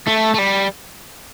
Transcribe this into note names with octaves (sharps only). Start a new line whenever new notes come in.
A3
A3
G3